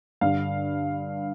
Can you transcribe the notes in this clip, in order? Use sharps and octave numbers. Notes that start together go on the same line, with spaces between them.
G2 D3 F5